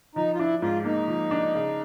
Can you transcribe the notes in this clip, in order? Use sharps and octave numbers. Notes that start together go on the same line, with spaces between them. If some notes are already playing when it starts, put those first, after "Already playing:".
F3 D#4
F4
D4 E4
G#2 F4
A#3 D#4
F3
D4
C#3